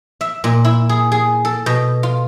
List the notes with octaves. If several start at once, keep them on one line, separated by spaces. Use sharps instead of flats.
E5
A#2
E4
G#4
G#4
A4
B2
F4